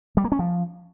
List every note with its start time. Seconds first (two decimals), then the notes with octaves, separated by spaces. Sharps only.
0.17 G3
0.24 A#3
0.32 C#4
0.39 F3